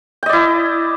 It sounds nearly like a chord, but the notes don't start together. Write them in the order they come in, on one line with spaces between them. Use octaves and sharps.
G5 D#5 D5 E4